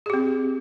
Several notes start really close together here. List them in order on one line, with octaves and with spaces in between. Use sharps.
G#4 G4 C4